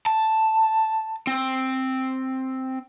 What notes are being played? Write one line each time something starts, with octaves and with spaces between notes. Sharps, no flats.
A5
C4